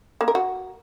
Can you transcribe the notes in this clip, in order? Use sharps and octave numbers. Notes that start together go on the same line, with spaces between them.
A#3
A#4
F#4